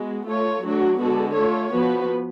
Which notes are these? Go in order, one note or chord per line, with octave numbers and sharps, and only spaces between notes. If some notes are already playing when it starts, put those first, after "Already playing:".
Already playing: G#3 B3 F#4
A3 F4 A4 C#5
F#3 A3 D4 F#4
D3 G#3 B3 F#4 A4
A3 F4 A4 C#5
F3 B3 F#4 B4